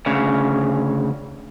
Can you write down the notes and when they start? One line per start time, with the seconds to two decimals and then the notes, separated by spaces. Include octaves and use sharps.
0.06 D2 C#3